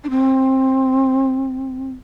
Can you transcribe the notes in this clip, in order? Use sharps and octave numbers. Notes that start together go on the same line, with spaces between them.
D4
C4